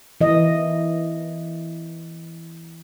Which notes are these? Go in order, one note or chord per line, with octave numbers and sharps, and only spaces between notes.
E3 D#5